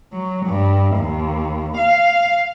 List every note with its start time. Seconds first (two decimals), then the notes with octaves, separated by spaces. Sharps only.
0.13 F#3
0.45 G2
0.96 D#2
1.77 F5